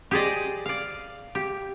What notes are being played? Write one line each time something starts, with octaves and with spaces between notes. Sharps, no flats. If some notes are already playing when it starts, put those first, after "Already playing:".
G4 G#4 C5 D5 D#5
D5 F5
G4